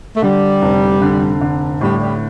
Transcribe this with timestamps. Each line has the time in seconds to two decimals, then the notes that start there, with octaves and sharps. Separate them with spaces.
0.15 A3
0.22 D3 G3
0.62 F1
1.02 D3
1.41 D3
1.81 A2 G3
2.01 G3